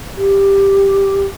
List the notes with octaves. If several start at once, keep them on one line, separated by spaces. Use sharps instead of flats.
G4